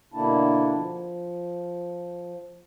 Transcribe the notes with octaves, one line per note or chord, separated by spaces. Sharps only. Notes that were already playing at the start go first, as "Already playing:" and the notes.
B2 D3 A#3 D4 E4 A5
F3